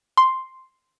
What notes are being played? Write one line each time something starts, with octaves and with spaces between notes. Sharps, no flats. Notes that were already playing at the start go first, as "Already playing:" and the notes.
C6